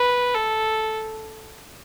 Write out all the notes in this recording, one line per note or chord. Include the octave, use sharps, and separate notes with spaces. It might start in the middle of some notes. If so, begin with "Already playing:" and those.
Already playing: B4
A4